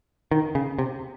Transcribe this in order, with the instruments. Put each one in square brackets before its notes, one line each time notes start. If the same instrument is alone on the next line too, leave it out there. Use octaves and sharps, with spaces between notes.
[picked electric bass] D#3
C#3
C3